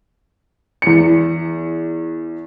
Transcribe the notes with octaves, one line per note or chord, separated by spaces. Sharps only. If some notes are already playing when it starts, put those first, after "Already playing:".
E2 C#7